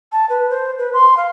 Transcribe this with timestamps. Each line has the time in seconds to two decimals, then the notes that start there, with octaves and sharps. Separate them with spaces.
0.12 A5
0.30 B4
0.50 C5
0.79 B4
0.94 C6
1.17 F5